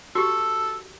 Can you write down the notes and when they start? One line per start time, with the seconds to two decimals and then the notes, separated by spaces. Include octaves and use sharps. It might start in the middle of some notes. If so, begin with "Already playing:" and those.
0.15 F#4 G4 A4